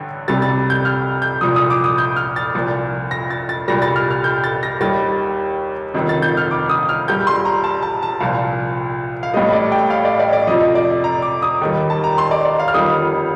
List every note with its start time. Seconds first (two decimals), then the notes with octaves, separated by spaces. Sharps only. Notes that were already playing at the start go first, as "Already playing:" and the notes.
Already playing: A1 G2 D3
0.28 C2 C3 G3 A6
0.42 A6
0.70 G6
0.85 F6
1.22 G6
1.41 C2 A#2 F3 D#6
1.56 D#6
1.70 D6
1.84 D#6
1.98 G6
2.16 F6
2.36 A6
2.55 C2 A#2 F3
3.11 A#6
3.30 A6
3.49 A6
3.68 C2 A#2 G3 A#6
3.82 A6
3.96 F6
4.11 F6
4.24 G6
4.44 A6
4.63 A#6
4.81 D#2 D#3 G3 A6
5.94 G1 F2 C3 D#3
6.09 A6
6.22 G6
6.37 F6
6.51 D6
6.69 D#6
6.89 F6
7.08 A#1 A#2 G3 G6
7.27 C6
7.45 A#5
7.64 A5
7.83 A5
8.03 A5
8.20 C2 A#2 F3 F5
9.23 F5
9.34 A1 A2 G3 D#5
9.53 D5
9.72 G5
9.90 F5
10.05 D5
10.20 D5
10.33 D5
10.47 F2 C3 F3 D#5
10.75 D5
11.04 A#5
11.22 D6
11.42 D#6
11.61 D#2 D#3 G3
11.90 A5
12.04 A#5
12.18 C6
12.31 D5
12.45 D5
12.59 F5
12.68 F6
12.74 G1 F2 D#3 G3 D#6